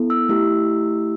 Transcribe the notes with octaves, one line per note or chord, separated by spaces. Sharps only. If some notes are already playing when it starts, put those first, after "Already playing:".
Already playing: B3 E4 A4
E6
A3 E4 G4